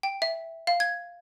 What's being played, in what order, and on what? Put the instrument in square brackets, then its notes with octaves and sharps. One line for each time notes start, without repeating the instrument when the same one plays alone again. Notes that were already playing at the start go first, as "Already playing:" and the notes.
[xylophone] G5
E5
F5
G#6